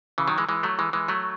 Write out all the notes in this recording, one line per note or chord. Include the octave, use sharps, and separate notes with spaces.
C#3 E3
D#3 F#3
E3 G#3
E3 G#3
F#3 A3
E3 G#3
E3 G#3
F#3 A3